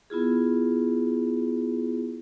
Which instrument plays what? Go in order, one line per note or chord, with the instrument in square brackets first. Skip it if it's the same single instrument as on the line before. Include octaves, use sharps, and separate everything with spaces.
[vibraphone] B3 E4 F4 G#4